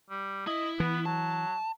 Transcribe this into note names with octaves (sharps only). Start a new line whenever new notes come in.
G3
E4 D#5
E3 B3
F#3 A5